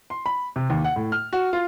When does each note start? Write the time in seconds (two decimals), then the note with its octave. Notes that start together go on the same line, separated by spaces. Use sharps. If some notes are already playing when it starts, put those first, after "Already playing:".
0.10 C6
0.26 B5
0.56 C3
0.70 D#2
0.84 F#5
0.96 A2
1.12 F6
1.33 F#4
1.53 F4